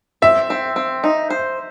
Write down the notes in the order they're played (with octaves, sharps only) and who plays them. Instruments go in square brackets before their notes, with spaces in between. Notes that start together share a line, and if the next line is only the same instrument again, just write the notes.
[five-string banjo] C4 [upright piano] E5
[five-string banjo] C4
C4
D#4
C5